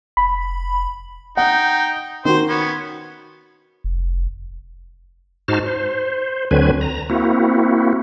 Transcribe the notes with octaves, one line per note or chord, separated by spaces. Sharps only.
F1 B5
D#4 F#5 G5
D#3 F#4 C5
B3 C#4
F1
G#2 D#4 F#4 C5 A5 F6
C5
D2 D3 F#3 C4 B4 G#5
A#5
A#3 C4 E4 F#4